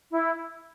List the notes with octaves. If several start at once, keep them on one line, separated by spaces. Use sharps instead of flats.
E4